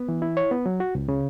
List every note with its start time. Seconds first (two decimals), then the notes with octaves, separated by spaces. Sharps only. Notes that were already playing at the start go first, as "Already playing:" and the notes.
Already playing: B3
0.09 E3
0.22 E4
0.37 C#5
0.51 B3
0.66 F#3
0.80 F#4
0.95 C#2
1.08 C#3